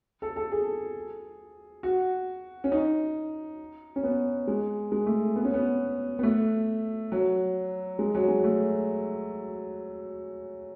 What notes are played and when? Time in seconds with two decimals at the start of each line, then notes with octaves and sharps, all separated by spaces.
0.22 A4
0.36 A4
0.52 G#4
1.83 F#4
2.64 C#4
2.72 D#4
3.96 C#4
4.04 B3
4.47 G#3
4.92 G#3
5.06 A3
5.36 B3
5.45 C#4
5.54 B3
6.19 B3
6.23 A3
7.12 F#3
7.99 G#3
8.15 F#3
8.28 G#3
8.44 A3